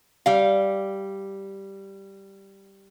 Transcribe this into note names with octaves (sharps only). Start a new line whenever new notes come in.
G3 F5